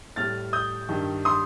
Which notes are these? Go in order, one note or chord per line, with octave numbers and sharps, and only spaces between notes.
A2 G3 F6 A6
D#6 G6
G2 D#3 G3
C6 D#6